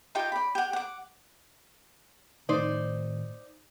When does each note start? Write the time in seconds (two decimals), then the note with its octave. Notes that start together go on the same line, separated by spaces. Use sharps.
0.15 D#4 F4 G4 G5
0.32 D5 B5
0.55 G4 F#5
0.73 F#5 D6
2.49 A2 D#3 A3 D#4 C5 D5